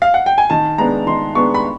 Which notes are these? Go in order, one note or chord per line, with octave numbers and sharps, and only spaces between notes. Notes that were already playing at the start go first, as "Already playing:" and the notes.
F5
F#5
G5
G#5
D#3 A5
G#3 B3 D4 A#5
D#3 C6
G#3 B3 D4 C#6
B5